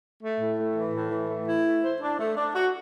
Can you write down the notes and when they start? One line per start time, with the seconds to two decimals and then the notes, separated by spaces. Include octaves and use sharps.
0.22 A3
0.39 A2
0.58 A3
0.75 E3
0.93 A2
1.11 E3
1.28 A3
1.46 E4
1.65 A3
1.82 C5
2.01 D4
2.19 A3
2.36 D4
2.54 F#4